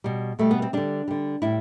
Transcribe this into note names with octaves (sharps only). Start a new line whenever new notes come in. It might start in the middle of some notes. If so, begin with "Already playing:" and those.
B2 G3
B2 G3 A3
B3
C4
D3 G3 D4
D3 G3
A2 G3 E4